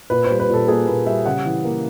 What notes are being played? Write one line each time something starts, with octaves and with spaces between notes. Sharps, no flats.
A#2 B4
C5
G3
B4
A#2 A4
A#3 G#4
A#2 B4
G3 E5
C#3 F#5
E3
A#3